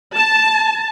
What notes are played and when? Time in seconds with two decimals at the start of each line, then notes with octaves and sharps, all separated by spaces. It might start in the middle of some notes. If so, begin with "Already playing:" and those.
0.16 A5